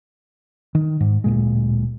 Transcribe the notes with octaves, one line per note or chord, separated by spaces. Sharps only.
D#3
G#2
D1 A#2 G#3